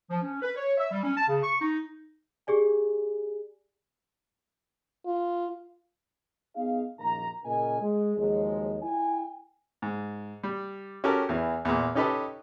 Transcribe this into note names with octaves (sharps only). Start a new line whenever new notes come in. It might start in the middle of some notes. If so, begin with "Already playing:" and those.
F3
C#4
B4
C#5
E5
G3
C#4
A5
C#3
C#6
D#4
G4 G#4 D5 G#5
F4
B3 D#4 G#4 F5
A#1 F#2 D#3 A#3 A#5
A#2 C#3 A#4 D#5 G#5
G#3
D#2 F3 F#3 G#3
E4 G5 G#5
G#2
G3
C#4 F#4 G4 A4 A#4
E2 E3
E2 A#2
C#4 D#4 G4 A4 B4 D#5